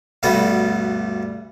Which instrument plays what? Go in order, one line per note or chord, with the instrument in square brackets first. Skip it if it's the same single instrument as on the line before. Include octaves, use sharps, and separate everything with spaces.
[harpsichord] D2 G2 B2 G3 B3 A4